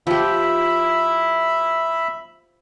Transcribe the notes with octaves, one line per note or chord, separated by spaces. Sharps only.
F3 G4 E5 B5